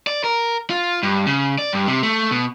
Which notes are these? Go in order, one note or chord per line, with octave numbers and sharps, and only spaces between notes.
D5
A#4
F4
G2
C#3
D5
G2
C3
A3
B2